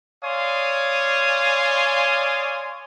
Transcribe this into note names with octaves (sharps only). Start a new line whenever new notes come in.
C#5 D5 F5 G#5 C6 D#6